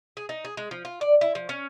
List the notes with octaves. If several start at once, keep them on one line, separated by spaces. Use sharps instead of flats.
G#4
D#4
G#4
G#3
F3
F4
D5
E4
F3
C#4